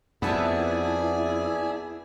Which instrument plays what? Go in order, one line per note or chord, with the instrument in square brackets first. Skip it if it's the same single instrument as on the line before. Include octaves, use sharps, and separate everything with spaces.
[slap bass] F2 [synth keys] B3 E5 A5 [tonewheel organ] E4 [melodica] G#4 D5 G#5